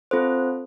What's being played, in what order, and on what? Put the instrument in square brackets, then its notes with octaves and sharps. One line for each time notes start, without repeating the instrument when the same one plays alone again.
[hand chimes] C4 F4 A4 C5